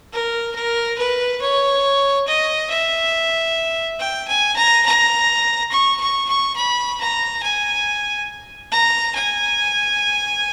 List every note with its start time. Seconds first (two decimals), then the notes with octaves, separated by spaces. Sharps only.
0.13 A#4
0.55 A#4
0.98 B4
1.41 C#5
2.27 D#5
2.70 E5
4.00 G5
4.28 G#5
4.56 A#5
4.86 A#5
5.71 C#6
6.00 C#6
6.29 C#6
6.57 B5
7.01 A#5
7.42 G#5
8.72 A#5
9.15 G#5